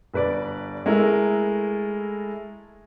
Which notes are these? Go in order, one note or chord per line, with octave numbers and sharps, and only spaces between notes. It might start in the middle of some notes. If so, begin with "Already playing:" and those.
G1 B4 D5
G#3 A3 E4 A4 A#4 E5